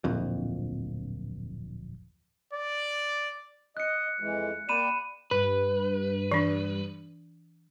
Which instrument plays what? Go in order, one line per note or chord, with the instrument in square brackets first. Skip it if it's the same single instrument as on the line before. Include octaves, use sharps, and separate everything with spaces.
[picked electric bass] D1 A#1 F2
[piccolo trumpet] D5
[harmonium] D#5 [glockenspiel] F#6 C#7
[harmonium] F2 E3 G#3
[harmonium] A#3 D5 G5 [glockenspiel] B5 D#7 E7
[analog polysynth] G2 [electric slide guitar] B4
[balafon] E3 D4